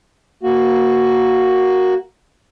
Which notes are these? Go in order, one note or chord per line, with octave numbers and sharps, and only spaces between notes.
A#3 F#4